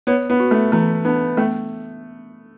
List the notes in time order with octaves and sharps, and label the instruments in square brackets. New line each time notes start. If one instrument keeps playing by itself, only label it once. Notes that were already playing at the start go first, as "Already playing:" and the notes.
[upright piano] B3 [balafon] C#5
[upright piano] B3
[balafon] F#4
[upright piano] A3
[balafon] E3 [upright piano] A3
[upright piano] B3 [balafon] D4
[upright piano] A3 [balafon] B3